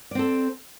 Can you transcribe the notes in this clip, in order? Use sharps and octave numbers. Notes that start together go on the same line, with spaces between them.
C4 A4 D5